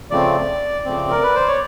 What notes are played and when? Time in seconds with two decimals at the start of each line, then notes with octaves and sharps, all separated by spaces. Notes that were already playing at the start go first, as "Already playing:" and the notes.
0.11 C#3 F3 A3 C4 D5
0.85 C#3 F3 A3 C4
1.10 A#4
1.23 B4
1.35 C5
1.48 C#5